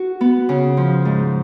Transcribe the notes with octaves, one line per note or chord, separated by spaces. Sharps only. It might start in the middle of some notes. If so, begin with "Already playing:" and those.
Already playing: F#4
B3
C#3
F3
G#2